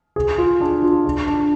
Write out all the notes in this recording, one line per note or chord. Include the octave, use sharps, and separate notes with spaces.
G#4
F4
D4
F4
D4
D4